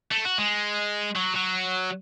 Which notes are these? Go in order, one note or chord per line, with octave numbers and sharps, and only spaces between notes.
A3
F#4
G#3
F#3
F#3